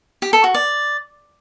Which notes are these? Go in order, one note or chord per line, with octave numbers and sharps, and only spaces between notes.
G4
A4
F#4
D5